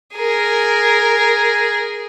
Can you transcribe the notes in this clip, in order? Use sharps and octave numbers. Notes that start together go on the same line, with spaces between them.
G#4 A#4